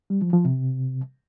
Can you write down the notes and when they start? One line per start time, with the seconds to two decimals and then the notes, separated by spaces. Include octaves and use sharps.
0.10 G3
0.22 F3
0.33 F3
0.45 C3